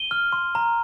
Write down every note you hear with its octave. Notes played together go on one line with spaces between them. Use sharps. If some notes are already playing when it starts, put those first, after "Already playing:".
Already playing: D#7 G7
F6
C6
A#5